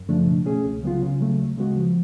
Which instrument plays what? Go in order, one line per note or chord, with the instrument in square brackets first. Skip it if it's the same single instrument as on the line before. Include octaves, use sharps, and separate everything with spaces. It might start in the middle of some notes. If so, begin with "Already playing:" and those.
Already playing: [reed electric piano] F#2
C#3 F3 A3 D4
B2
A3 C#4 G#4
C#2
C#3 F#3 B3 F4
C#3
F#3 A3
D2
C#3 G#3 B3 F#4
F3